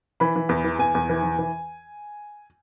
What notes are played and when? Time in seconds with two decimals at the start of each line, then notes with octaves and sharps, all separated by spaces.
0.20 E3 B5
0.36 E3
0.49 E2
0.64 E3
0.79 E2 G#5
0.95 E2
1.09 E3
1.23 E3
1.39 E3